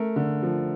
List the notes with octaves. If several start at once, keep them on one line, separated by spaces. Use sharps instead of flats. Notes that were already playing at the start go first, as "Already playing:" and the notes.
Already playing: A3 A#4
D3
F3